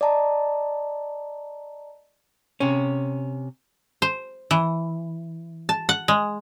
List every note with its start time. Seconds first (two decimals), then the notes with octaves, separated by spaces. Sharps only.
0.01 D5 D#5 A5 A#5
2.60 C3 C#4
4.02 C5
4.51 E3
5.69 A5
5.89 F#5
6.08 G#3